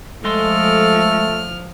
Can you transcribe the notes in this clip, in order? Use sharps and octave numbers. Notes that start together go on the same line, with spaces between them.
F3 G#3 A3 A4 D#5 C6 F6